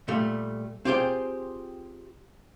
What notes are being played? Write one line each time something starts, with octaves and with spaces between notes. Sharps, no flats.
A#2 G3 A3
C4 F4 G4 G#4 C5 G5